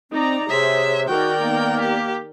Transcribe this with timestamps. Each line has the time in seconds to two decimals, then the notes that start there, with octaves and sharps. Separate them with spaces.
0.11 C4 D#4 D5 A#5
0.49 C3 G#4 C5 C#5 E5
1.09 D#3 F#4 A#4 D5 G5
1.40 A#3 B3
1.80 G4